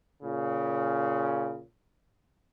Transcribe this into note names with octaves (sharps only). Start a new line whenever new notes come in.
A#2 C#3